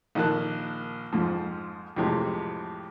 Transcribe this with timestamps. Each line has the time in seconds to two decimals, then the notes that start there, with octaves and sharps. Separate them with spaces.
0.15 A#1 D#3 A#3 A#4 A5 F#6
1.13 F2 G#2 F3
1.96 F2 A2 C3 E3 G#3